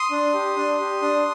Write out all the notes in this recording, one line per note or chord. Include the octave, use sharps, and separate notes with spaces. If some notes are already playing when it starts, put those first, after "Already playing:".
Already playing: C6 D#6
D4
G4
D4
G4
D4